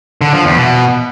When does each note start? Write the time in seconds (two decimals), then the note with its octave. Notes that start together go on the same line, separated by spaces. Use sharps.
0.21 D3
0.33 F3
0.45 E2
0.57 B2